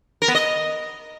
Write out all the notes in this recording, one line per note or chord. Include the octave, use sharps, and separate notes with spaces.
A#4
B3
D#5